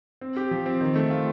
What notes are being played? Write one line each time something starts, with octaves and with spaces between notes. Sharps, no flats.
C4
G4
F3
C4
D#3
A3
F4